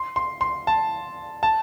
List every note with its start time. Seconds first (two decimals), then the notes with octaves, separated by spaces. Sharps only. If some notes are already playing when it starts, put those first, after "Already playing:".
Already playing: C6
0.16 C6
0.41 C6
0.67 A5
1.43 A5